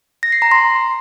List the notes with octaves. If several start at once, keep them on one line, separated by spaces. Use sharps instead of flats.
A#6
C7
A#5
C6